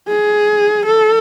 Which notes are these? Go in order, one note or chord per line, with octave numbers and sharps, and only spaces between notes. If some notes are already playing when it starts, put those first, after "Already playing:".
G#4
A4